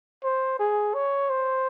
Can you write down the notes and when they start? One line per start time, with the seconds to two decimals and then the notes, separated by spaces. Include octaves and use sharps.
0.23 C5
0.59 G#4
0.94 C#5
1.30 C5